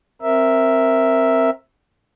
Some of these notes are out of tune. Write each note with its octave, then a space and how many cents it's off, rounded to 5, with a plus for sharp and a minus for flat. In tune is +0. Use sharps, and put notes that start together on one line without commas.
C4 +15 A#4 +0 E5 +0